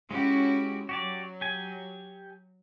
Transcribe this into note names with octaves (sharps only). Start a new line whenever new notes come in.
G#3 C#4 E4 F#4 G4
F#3 F#4 G4 D5
G4 G#5